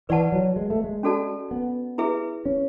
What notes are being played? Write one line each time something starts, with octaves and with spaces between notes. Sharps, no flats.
E3 B4 D5 F#5 A5
F#3
G#3
A3
G#3
C#4 F#4 A4 D5 A5
B3
E4 G#4 B4 E5
C#4